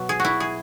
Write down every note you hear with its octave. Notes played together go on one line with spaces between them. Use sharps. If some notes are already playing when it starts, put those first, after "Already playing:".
Already playing: B2 F#3
G#4
F#4
E4
G#4